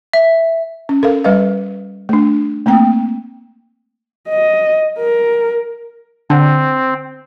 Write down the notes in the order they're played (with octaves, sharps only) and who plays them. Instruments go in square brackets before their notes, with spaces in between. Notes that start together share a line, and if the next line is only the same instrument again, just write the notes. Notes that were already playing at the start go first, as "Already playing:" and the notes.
[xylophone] E5
[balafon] C#4
A4 A#4 F5
G3 B4 D#5 F5
A3 D4
A3 A#3 C4 G5
[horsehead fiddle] D#5
A#4
[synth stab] D3 [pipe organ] C4